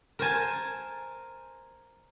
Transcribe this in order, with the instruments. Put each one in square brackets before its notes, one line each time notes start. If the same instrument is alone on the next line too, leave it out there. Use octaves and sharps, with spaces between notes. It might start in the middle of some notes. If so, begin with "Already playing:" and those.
[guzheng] A#4 C5 G#5 A5